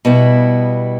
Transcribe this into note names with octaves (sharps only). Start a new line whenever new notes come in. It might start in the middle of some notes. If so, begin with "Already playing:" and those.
B2 G3 B3 E4